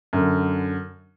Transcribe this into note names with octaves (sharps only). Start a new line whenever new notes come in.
F#2 D3